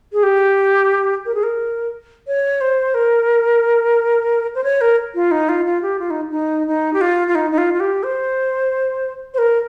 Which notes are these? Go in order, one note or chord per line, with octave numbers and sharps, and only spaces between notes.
G#4
G4
A#4
G#4
A#4
C#5
C5
A#4
C5
C#5
A#4
F4
D#4
F4
F4
G4
F4
D#4
D#4
D#4
G4
F4
F4
D#4
D#4
F4
F4
G4
C5
C5
A#4